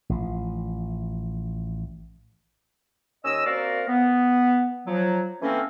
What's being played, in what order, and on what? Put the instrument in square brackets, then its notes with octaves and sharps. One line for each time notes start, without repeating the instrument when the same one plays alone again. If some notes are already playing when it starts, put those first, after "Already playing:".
[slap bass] A1 F3
[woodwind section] D#2 C#4 D#5 E6
A#3 C4 F#4 A#4 D5 F5
B3
F3 F#3
E3 A3 A#3 C4 C#4